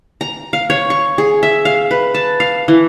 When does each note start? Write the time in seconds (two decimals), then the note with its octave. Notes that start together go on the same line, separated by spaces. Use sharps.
0.21 A#5
0.53 F5
0.70 C#5
0.90 C#6
1.18 G#4
1.43 E5
1.65 F5
1.91 B4
2.14 A5
2.40 F5
2.68 E3